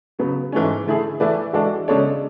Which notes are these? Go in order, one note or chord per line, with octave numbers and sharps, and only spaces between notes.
C#3 F#3 B3
G#2 E3 A3 C#4
D3 A3 E4 G#4
E3 A3 E4 B4 D5
E3 G#3 D4 F#4 A4
C#3 G#3 D4 A4 C#5